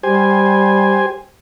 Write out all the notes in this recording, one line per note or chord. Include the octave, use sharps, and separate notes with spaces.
G3 G4 C5 G#5